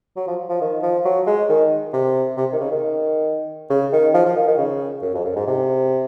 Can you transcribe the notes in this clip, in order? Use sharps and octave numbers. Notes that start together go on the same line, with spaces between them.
F#3
F3
F3
D#3
F3
F#3
G#3
D#3
C3
C3
D#3
C#3
D#3
C#3
D#3
F3
F3
D#3
D#3
C#3
F#2
F2
F#2
G#2
C3